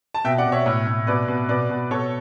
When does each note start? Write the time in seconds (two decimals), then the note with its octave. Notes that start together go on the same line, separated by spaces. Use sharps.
0.14 A5
0.24 B2 E5 G5
0.38 D5 F#5
0.46 B2
0.52 C#5 E5
0.66 A2
0.87 A2
1.07 B2 B4 D5
1.28 B2
1.49 B2 B4 D5
1.69 B2
1.91 B2 A4 C#5